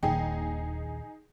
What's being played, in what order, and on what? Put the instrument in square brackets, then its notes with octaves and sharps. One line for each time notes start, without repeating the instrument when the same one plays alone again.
[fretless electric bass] D#1 [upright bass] A#1 D#2 [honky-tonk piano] D#4 G#4 [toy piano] G5